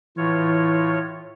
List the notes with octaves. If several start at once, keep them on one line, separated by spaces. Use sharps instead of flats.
A2 E3 F4 C#5